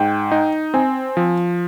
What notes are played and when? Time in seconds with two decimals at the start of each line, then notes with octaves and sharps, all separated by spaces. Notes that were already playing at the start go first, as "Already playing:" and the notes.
Already playing: G#2 G5
0.32 D#4
0.74 C4 G#5
1.17 F3